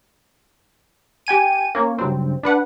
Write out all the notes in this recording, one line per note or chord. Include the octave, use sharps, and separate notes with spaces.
G4 G5 G#5 D#7
A#3 C#4 C#5
G2 C#3 F#3 G3 C4
D4 B4 F#5